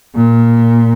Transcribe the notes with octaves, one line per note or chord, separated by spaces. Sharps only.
A#2